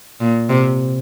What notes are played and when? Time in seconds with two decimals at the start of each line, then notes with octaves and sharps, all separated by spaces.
0.20 A#2
0.49 C3